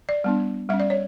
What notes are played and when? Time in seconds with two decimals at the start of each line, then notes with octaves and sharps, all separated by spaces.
0.09 D5
0.24 G3 B3 D4
0.69 G3 C#4 E5
0.80 D5
0.90 C#5